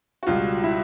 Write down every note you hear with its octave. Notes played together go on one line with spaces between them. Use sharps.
F#4
C#2 B2 G3 F4
E4